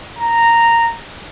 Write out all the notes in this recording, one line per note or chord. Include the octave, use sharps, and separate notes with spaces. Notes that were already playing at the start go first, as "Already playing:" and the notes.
A#5